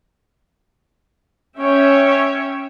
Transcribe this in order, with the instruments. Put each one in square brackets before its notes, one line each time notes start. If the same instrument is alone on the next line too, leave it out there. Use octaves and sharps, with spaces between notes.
[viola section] C#4 C#5 E5 G5